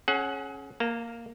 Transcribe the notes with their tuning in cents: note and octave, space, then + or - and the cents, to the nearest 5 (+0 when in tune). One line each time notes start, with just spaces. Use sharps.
C#4 -15 G#4 +35 F#5 +0
A#3 +0 A#5 -40